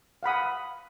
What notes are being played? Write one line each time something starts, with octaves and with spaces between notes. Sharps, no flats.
F5 F#5 B5 D#6